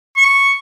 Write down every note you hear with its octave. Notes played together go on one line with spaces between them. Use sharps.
C#6